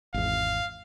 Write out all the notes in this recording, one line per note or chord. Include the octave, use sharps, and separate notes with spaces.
G#1 E2 F5